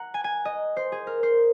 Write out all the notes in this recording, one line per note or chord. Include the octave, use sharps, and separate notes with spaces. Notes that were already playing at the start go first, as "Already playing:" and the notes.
Already playing: F#5 A#5
G#5
G#5
D#5
C5
G#4
A#4
C5